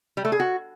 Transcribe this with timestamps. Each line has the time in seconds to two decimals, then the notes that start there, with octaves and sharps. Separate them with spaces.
0.17 G3
0.25 A3
0.32 G#4
0.40 F#4